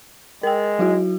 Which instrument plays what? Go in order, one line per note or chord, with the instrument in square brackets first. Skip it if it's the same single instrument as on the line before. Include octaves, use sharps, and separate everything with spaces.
[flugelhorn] G#3 [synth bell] A#4 G5
[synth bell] F#3 E4 F#4